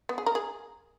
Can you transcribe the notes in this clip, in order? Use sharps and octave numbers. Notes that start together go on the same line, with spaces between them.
B3
G#4
A#4
G#4